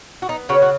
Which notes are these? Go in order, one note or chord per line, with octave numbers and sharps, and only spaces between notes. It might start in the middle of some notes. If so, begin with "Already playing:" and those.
F#4
B3 D#4
C#3 C#4 F#4
F#4